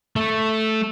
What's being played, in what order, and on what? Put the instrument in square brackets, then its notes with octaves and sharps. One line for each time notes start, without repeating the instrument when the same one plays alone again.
[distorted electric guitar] A3